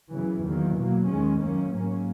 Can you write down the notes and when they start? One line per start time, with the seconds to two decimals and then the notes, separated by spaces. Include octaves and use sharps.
0.13 F#2 C#3 E3 B3
0.44 E2 D#3 F#3 A#3
0.77 B2 F#3 A#3
1.07 D#2 D#3 G#3 C#4
1.40 F#2 D#3 A#3 C#4
1.71 G#2 F#3 A#3 C#4